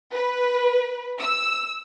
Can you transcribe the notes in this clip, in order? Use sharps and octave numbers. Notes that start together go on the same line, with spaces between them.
B4
E6